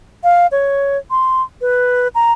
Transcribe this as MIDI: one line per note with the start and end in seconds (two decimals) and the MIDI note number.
0.23 0.47 77
0.51 0.98 73
1.10 1.42 84
1.61 2.08 71
2.15 2.32 82